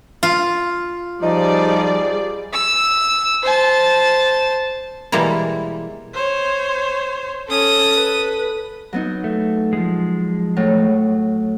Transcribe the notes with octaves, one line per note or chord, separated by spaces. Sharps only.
F4
F3 G3 D#4 G#4 D5
E6
C5 A5
B2 E3 G3 G#3 A#3 E4
C5 C#5
C#4 A4 D#6
B4
F#3 B3 D#4
A3
F3 G#3
A2 F#3